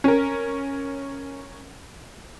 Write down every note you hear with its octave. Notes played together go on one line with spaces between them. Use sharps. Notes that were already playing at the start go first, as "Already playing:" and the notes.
C#4 A#4